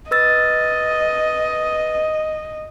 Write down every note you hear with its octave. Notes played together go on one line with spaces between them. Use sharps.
B4 D#5 E6 A6